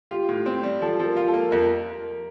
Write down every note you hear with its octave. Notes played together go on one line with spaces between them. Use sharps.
F4 G4
A2
C4
G3
F3 A4
F3
A#4
F4
A4
A#3
F2 A#4